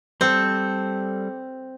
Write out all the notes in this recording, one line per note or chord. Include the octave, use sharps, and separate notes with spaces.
G3 C4 A4